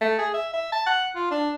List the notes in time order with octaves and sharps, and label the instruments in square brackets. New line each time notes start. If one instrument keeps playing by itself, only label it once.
[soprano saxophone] A3
G#4
E5
E5
A5
F#5
F4
D4